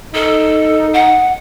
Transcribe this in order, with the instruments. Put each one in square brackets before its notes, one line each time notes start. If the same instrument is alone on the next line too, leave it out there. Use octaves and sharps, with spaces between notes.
[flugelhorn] D#4 [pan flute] A4
[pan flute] F#5